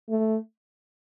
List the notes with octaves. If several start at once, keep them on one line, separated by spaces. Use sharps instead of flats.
A3